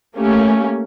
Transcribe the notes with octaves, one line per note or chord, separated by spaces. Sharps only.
A3 A#3 C#4 G4